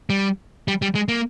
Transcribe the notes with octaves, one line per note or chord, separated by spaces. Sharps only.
G3
G3
G3
G#3
A#3